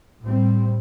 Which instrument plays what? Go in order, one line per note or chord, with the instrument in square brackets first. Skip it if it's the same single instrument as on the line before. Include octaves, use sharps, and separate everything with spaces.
[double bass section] A2 G3 C4